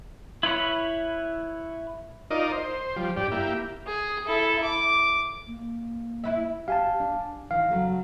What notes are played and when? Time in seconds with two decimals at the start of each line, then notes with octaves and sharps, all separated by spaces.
0.43 E4 B4 C#5 B5
2.31 D#4 F4 A#4 D5 D#5
2.52 C5
2.96 F3 G3
3.17 G2 G4 D5
3.32 A#3 E4 G4
3.87 G#4
4.27 E4 A4
4.64 D6
5.47 A#3
6.24 E4 B4 E5
6.68 G4 F5 G#5 A5
7.00 D4
7.51 D#3 E3 F5
7.70 C#3 F#3 A3